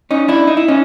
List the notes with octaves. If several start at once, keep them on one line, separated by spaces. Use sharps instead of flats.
C#4 D#4
D4 E4
D#4
E4
C#4 D#4